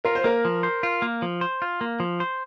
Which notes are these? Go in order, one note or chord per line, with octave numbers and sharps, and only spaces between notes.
F4 A#4
C5
A#3 A#4
F3
C5
F4
A#3
F3
C5
F4
A#3
F3
C5